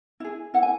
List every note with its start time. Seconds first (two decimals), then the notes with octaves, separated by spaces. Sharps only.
0.20 E4 G#4
0.54 E4 F#5
0.63 G#5